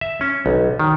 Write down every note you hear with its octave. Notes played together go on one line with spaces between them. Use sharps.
E5
C#4
B1
D#3